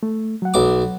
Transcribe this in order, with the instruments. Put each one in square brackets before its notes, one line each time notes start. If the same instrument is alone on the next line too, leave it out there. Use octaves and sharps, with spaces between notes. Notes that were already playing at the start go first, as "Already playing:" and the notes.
[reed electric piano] A3
F#3 F#5
[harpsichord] B1 D6